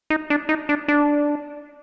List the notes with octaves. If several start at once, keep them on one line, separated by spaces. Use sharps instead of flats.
D#4
D4
D#4
D4
D4